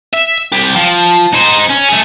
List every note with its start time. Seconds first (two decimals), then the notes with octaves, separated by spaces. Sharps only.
0.13 E5
0.52 C2 G4
0.75 F3
1.33 D#4 C5
1.69 C#4
1.89 A3 G#4